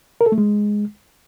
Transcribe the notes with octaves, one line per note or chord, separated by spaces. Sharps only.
A#4
A4
A3
G#3